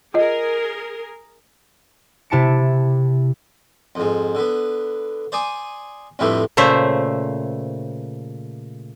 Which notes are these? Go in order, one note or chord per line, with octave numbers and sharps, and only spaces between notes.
F4 G#4 A#4 D#5
C3 E4 A5 C#7 D7
F2 G#2
D3 B3
C5 D5 G#5 D#6
F2 A2 D3 G3 A3 B3
A#2 C#3 A3 C5 E5